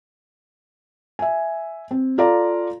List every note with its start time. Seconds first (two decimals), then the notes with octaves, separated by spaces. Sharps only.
1.19 E5 G#5
1.91 C4
2.18 F4 A4 D5 F5 A#5